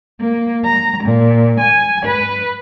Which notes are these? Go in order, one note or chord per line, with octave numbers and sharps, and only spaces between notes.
A#3
A#5
A#2
G#5
B4